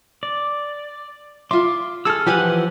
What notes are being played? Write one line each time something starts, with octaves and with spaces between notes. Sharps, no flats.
D5
F4 E5 C6 D6
G#4 A4 E6 F6
E3 F3 G4 B4 F#5 G#5